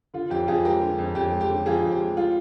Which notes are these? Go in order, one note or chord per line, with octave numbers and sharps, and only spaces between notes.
D3 F4
F2 G4
F2 F4 G#4
G#3 G4 A#4
D3
F2
F2 G4
G#3
G4
D3
F2 F4 G#4
F2
G4
G#3
G3 F4